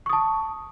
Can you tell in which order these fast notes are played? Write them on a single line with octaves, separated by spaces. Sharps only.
C#6 D#6 A5